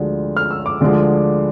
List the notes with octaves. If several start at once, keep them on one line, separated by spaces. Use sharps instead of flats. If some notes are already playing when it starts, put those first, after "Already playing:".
Already playing: D2 D3 F3 G#3
F6
E6
D6
D2 D3 F3 G#3